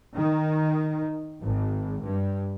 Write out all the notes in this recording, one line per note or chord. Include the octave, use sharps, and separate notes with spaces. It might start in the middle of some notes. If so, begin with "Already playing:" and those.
D#3
G#1
G2